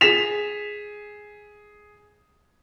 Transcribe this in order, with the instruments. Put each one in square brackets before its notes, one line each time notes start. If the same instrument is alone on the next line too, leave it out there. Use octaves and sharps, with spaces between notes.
[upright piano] G#4 B6 E7 F7